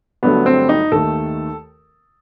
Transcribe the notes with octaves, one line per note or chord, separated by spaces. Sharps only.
G1 G2 F#3 A3 B3
C4
D#4
D#2 D#3 A3 A4